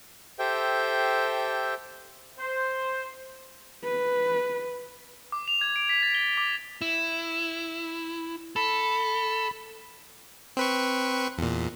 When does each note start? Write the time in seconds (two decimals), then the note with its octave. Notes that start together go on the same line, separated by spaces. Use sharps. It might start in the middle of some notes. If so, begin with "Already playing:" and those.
0.39 G4 A4 C5 E5 G5
2.39 C5
3.84 B4
5.32 D6
5.48 F7
5.61 G#6
5.76 D7
5.89 B6
6.03 A6
6.15 G7
6.37 D6
6.82 E4
8.56 A4 B5
10.57 C4 B4 C#6
11.38 E2 A#2